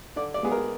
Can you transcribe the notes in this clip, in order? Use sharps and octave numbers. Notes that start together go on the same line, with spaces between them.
D3 D5
D5
G#3 B3 G#4
A#4